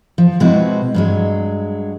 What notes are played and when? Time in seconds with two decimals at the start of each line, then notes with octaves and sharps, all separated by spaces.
0.18 F3
0.40 B2 G#3 C4 E4 F#4 B4
0.94 G2 F#3 G#3